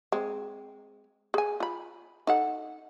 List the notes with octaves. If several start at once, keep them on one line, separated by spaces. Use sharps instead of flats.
G#3 C4
G#4 G#5
F4 B5
D#4 A4 F#5